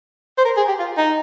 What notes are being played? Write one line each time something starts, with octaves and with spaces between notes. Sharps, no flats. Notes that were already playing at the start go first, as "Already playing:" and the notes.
C5
A#4
G#4
G4
F4
D#4